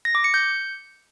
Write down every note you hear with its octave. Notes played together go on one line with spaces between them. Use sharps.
A#6
D6
C#7
G6